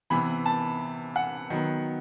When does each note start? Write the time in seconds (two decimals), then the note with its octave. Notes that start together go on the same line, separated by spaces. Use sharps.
0.10 C3 E3 B3 B5
0.46 A5
1.16 F#5
1.50 D#3 F#3 B3